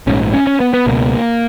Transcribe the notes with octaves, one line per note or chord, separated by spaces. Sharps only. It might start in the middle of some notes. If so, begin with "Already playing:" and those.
A#1 G#2 C#4
C#4
C#4
B3
B3
C#2 B2 A#3